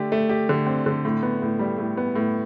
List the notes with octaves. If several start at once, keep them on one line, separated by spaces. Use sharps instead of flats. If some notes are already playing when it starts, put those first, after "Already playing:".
Already playing: D3 A3 G4
A3
G4
D3
C4
D3
A2
B3
A2
G3
A2
B3
A2